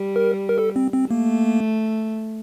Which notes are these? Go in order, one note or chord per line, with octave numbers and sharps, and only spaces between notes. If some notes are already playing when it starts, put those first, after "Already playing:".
Already playing: G3
A#4
A#4
A4
C4
C4
A3 A#3